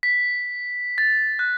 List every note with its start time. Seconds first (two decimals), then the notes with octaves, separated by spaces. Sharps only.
0.03 B6
0.98 A6
1.39 F#6